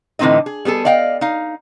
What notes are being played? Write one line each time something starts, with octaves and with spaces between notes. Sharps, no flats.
A2 D3 E3 C4 D#4 D#5
G#4
G3 B3 G#4 A4
D5 D#5 F5 G5
D#4 F5